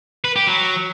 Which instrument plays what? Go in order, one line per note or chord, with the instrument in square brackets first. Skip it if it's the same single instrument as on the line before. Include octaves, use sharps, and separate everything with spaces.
[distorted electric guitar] B4
G4
F#3